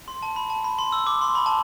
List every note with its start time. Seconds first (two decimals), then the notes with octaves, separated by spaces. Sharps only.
0.08 C6
0.23 A5
0.36 B5
0.50 A5
0.64 B5
0.79 C6
0.92 E6
1.07 D6
1.21 C6
1.35 B5
1.46 A5